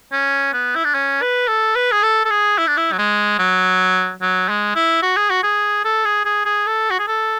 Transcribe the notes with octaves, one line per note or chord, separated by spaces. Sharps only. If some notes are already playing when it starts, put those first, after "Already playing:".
C#4
B3
E4
D4
C#4
B4
A4
B4
G#4
A4
A4
G#4
E4
D4
E4
F#3
G#3
F#3
F#3
G#3
E4
F#4
G#4
F#4
G#4
A4
G#4
G#4
G#4
A4
F#4
G#4
A4